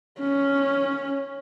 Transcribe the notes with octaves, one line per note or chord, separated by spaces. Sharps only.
C#4